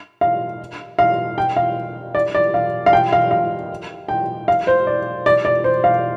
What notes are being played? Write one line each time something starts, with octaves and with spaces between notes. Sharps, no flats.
F5
F5
G5
F5
D5
D5
F5
F5
G5
F5
F5
G5
F5
C5
D5
D5
D5
C5
F5